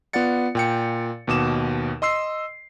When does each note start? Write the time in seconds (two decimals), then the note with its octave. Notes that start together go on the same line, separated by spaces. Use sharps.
0.13 B3 F4 D5 F#5 A6 C#7
0.55 A#2 G5 C#7
1.28 D#2 B2 D6 E7
2.02 D#5 C6 E6 C7